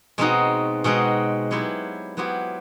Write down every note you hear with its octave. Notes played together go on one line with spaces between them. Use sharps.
B2 G#3 C4 D#4 F#4
B2 G#3 C4 D#4 F#4
F#3 B3 E4 G4 C5
F#3 B3 E4 G4 C5